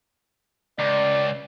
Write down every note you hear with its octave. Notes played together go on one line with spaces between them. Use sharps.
C#2 D5